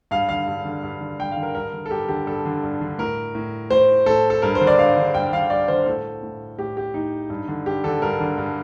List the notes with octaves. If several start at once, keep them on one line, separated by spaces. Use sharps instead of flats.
G2 F5
D3 F5
G2
D3
G2
D3
G2 G5
F5
D3
A#4
G2 A#4
D3
A4
G2 G4
D3 G4
G2 A4
D3
G2
D3
A2 A#4
A2
A2 C5
A2 A4
A4
G2 A#4
C5
D3
D5
G2 F5
D3
G2 G5
D3 F5
G2 D5
D3 C5
A2 A4
A2
A2 G4
G4
A2 D#4
G2
D3
G2 G4
D3 A4
G2 A#4
D3
G2